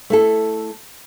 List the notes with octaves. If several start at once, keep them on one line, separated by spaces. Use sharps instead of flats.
A3 E4 A4